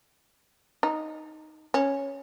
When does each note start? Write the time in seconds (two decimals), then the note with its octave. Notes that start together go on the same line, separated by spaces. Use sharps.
0.83 D#4
1.74 C#4